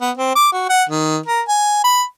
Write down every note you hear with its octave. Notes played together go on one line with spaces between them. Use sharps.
B3
C4
D6
F#4
F#5
D#3
A#4
G#5
B5